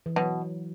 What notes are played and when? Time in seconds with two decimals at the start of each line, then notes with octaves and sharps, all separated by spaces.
0.06 E3
0.16 B2 F#3